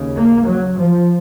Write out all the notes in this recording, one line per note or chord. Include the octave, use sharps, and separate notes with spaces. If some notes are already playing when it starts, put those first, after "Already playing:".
Already playing: D#2 C#3
A#3
F#3
F3